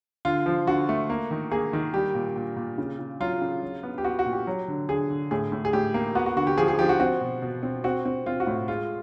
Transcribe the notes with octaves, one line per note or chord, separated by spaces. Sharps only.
D3 F4
F3
D3 F#4
A3
A#3
D#3
A#3 G#4
D#3
G3 G4
A#2
A#2
A#2
C#3
C#3
F#3 F4
C#3
F#3
B3
G4
B3 F#4
F#4
A#2
G4
F#3
D3
D3 G#4
D3
A2 G#4
A2
G#4
A2 G4
A#3
B3 F#4
F#4
D3 F#4
G4
F3 G#4
G#4
F3 G4
F#4
C4 F#4
B2
B2
C4
C4 F#4
C4
C4 F4
F#4
A2
G#3 F4